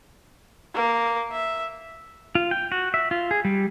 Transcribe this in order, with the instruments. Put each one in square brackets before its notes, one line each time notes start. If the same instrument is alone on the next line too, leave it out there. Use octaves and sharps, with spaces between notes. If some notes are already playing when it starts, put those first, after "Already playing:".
[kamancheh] A#3
E5
[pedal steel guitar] F4
G5
F#4
E5
F4
G#4
G3